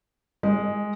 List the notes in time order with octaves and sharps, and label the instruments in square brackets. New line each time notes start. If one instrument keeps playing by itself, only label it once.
[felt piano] G#3